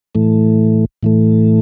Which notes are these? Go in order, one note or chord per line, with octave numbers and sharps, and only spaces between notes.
A2 E3 A3
A2 E3 A3